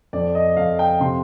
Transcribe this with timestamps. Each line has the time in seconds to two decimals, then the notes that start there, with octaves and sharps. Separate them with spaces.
0.13 F2 D5
0.35 D#5
0.57 F2 F5
0.79 G5
1.00 C3 C6